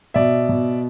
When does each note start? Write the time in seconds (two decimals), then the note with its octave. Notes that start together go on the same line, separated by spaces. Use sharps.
0.14 B2 D5 E5
0.49 B2